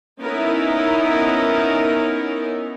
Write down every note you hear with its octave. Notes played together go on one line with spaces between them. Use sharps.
B3 C#4 D#4 E4 A#4